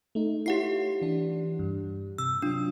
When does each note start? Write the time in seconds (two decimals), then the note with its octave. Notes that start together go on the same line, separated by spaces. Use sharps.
0.15 A3 D#4
0.46 E4 F4 G4 C#5 F#5 C7
1.01 E3 D4
1.59 G2
2.18 C3 E6
2.42 F#3 D4 F4